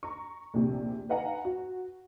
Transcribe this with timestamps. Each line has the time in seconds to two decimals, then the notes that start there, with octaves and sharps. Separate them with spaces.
0.03 A#5 C#6
0.54 A#1 D#2 C3
1.09 D#4 B4 F5 F#5 G#5 A#5
1.45 F#4